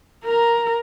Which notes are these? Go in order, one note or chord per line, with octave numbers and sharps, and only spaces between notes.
A#4 A#5